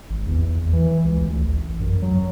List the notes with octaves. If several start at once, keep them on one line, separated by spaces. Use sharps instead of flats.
G#1
E2
E3
C#2
D2
A1
F#2
F#3